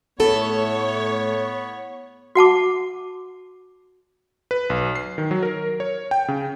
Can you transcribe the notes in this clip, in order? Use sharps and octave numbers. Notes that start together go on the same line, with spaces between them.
A2 A3 B3 A4 C#5
F#4 F#5 A5 D6
B4
B1
C7
D#3
F#3
A#4
C#5
G5
C#3